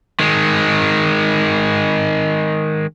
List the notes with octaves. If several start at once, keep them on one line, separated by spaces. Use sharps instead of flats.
D#3 G#3